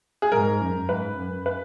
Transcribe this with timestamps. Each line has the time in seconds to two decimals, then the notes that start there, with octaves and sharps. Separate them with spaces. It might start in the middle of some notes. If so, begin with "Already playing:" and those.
0.22 G#4
0.32 G#2 A#4
0.61 F#2
0.89 G#2 B4
1.18 F#2
1.46 B4